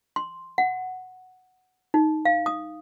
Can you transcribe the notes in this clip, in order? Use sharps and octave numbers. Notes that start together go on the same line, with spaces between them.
C6
F#5
D#4
F5
D#6